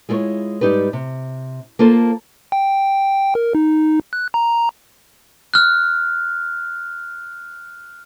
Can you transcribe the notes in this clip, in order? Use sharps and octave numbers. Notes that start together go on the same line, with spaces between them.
G#3 E4 F4 B4 C#5
G#2 G3 D#4 G4 B4
C3
A#3 F4 A4 C5
G5
A#4
D#4
F#6
A#5
F6 F#6